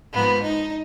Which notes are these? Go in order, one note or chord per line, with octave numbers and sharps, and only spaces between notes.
G#2 F3 A#3 B3
D#4